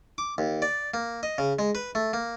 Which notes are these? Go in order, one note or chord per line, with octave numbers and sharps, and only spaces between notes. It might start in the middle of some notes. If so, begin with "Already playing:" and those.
D6
D#2
D5
A#3
D#5
C#3
G#3
B4
A3
A#3